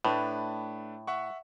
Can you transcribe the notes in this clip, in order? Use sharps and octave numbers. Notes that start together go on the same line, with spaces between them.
A2 A3 D4 B4
E5 F#5 C#6